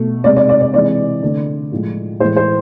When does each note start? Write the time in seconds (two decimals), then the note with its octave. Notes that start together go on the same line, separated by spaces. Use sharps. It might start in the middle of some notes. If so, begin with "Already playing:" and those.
Already playing: B2 A3
0.24 C3 G#3 D5
0.36 D5
0.49 D5
0.61 D5
0.74 C3 E3 G#3 D5
1.22 D3 A3
1.72 A2 F3 G#3
2.20 A2 C5
2.23 E3 G#3
2.36 C5